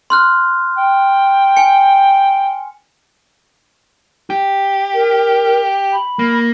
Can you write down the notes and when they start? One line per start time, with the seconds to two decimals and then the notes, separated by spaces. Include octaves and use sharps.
0.10 C6 F6 F#6
0.78 G5
1.57 G#5 C#7
4.30 G4
4.94 A#4
5.92 B5
6.19 A#3